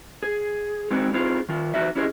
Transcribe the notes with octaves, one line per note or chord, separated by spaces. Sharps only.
G#4
G#3 C4 D#4 F#4
C4 D#4 F4 G#4
D#3 F4
E2 C#3 D#4 F#4 E5
C#4 E4 G4 G#4 C5 D#5